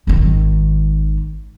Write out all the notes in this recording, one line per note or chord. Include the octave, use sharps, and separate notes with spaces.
G#1 D#3